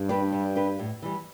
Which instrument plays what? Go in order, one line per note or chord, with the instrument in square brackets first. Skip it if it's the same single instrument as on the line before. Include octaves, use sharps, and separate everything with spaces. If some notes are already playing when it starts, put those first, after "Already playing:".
Already playing: [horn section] G2
[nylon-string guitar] D4 G4 B4
G3
D4 G4 B4
A2
E3 G3